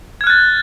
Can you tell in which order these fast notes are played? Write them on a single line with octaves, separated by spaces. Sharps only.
G#6 F6 F#6 A6